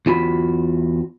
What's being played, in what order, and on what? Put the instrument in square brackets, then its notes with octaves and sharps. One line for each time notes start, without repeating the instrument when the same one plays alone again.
[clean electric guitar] E2 F4 F#4 B5